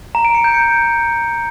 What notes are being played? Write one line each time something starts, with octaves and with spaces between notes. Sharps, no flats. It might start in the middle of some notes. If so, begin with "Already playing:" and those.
A#5
D7
C#7
G6
C#7